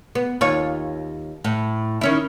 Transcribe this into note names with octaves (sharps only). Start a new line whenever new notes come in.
B3
D#2 F4 C#5
A2
D#3 C#4 E4